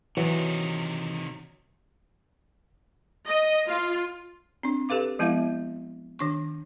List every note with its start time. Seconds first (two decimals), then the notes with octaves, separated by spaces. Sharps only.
0.17 C3 D#3 E3 F#3
3.28 D#5
3.68 F4
4.63 C4 D4
4.89 G4 A4 B4 F5 D6
5.19 F3 G#3 B3 E4 E5 F5
6.19 D#3 D4 C#6